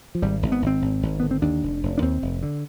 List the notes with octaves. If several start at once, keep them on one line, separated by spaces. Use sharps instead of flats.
F3
G#1 G3
G#1
B3
G#1 C4
G#1
G#1
D3 B3
C4
D#2 D4
F1
F1
D4
D#2 C4
F1
D3